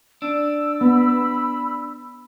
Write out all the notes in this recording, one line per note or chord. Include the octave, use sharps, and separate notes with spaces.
D4 E6
B3 B5